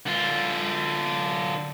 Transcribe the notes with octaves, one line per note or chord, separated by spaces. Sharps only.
D3 F4